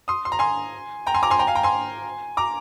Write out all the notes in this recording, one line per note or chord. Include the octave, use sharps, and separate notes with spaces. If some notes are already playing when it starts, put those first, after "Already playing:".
C6 D#6
C6
A#5
G#5 C6
G5 A#5
G#5 C6
A#5 D6
G#5 C6
G5 A#5
F5 G#5
G5 A#5
G#5 C6
A#5 D6